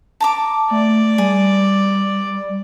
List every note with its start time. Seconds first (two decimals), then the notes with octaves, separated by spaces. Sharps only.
0.20 A5 A#5 D6
0.71 A3 D5
1.18 G3 G#4